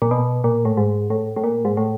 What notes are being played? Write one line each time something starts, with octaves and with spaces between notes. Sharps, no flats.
A#2
B2
A#2
A2
G#2
A2
A2
A#2
G#2
A2